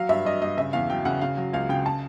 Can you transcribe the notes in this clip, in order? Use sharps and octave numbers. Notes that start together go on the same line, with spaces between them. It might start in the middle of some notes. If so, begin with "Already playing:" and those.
Already playing: F#3 F5
G2 E5
G2 D#5
G2 D#5
C#3 E5
E2 F5
F#3 G5
C#3 F#5
C#3 F5
F#3
C#2 F5
C#3 G5
A5